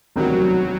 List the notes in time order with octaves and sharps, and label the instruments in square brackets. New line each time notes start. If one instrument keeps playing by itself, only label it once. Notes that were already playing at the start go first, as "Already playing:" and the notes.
[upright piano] E1 D2 C3 D#3 G3 [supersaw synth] F#3